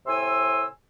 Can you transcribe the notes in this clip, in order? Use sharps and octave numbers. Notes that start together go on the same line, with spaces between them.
A2 C3 G#5 C6 E6